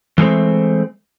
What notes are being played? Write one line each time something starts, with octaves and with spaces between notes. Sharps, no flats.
E3 G#3 A3 C4